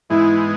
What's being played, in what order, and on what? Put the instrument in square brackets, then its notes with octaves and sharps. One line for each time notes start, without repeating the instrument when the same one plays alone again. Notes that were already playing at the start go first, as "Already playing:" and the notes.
[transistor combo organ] G#2 E3 G#3 B3 D#4 [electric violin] E4